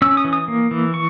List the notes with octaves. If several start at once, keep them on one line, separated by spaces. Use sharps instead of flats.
C#4 E6
D#6
E3
D#6
A#3
E3
C#6